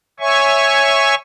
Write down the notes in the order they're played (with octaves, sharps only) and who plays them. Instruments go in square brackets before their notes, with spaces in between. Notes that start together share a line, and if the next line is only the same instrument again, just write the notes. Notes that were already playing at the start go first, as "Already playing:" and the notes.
[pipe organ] C#5 E5 G#5 C#6